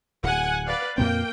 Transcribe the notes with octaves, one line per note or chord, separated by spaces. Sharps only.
D1 F#5 G#5
B4 D5 F5
F2 A#2 A#3 C4 G5